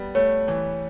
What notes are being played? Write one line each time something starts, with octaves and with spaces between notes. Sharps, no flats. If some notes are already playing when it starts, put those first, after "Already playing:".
Already playing: G3 B3
A3 C#5
E3